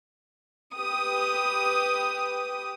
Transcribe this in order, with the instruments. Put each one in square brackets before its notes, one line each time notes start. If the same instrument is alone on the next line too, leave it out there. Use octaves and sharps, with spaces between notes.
[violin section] G4 B4 D#6